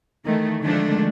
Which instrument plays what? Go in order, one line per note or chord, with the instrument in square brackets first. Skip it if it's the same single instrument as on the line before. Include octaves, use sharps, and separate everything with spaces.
[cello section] D#3 E3 A3
D3 D#3 F3 G#3 A3 D4